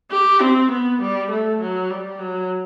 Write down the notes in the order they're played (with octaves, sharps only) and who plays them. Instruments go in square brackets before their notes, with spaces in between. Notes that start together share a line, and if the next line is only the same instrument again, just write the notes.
[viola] G4
C4
B3
G3
A3
F#3
G3
F#3